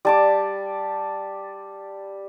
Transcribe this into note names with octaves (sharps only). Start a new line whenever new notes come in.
G3 A5 D6